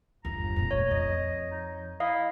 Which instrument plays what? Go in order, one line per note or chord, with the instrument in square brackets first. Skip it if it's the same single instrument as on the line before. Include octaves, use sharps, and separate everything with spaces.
[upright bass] G1 E2 [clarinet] A#5
[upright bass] F2 A#2
[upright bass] C#2 A3 [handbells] C#5
[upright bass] F2 [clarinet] D#5
[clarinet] D#4
[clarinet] E4 [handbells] D#5 F5 D#6